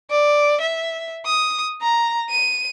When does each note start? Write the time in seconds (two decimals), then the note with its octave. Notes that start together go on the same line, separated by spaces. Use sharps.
0.10 D5
0.61 E5
1.26 D#6
1.82 A#5
2.30 D#7